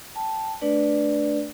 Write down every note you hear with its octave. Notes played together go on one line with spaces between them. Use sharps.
G5 A5
A3 D4 B4 D5